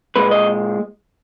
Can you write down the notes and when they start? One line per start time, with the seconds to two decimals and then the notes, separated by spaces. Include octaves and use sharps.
0.16 A#2 G#3 B4
0.31 D#5